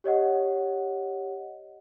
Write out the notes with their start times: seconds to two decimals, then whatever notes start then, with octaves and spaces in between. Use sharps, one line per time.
0.04 G4 C#5 D#5 F#5